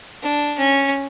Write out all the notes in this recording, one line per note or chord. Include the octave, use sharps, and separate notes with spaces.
D4
C#4